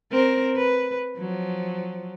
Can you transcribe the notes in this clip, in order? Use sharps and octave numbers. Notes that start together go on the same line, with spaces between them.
C4 A#4
B4
F3 F#3